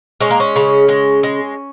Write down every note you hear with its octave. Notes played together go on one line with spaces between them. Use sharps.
G#3 C#4
A#3
C#4
C#3
G#3
G#3